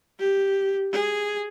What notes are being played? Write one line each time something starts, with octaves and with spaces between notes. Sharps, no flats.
G4
G#4